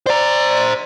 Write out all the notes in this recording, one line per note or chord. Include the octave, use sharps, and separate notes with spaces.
C5 D5 A#5